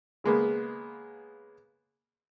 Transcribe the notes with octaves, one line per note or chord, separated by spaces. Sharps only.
C#3 G#3 A#3 B3